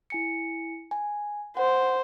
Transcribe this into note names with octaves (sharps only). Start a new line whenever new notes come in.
E4 G#5 C#7
G#5
C5 F#5